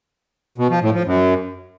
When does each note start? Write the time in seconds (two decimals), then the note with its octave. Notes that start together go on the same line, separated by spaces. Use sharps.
0.58 B2
0.70 F3
0.82 A2
0.94 F3
1.06 F#2